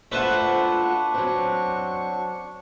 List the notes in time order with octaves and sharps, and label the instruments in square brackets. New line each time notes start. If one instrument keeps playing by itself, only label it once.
[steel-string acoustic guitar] A3 F4 F#5 [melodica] D4 C#6 [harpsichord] B4 C5 E5
[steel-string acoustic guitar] F#3 C4